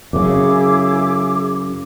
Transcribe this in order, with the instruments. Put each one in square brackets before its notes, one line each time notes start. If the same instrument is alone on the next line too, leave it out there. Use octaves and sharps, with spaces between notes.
[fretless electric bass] F#2 C#3 [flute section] E4 G#4 D6